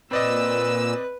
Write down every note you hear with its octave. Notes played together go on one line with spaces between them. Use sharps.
A#2 C4 B4 D5 D#5 E6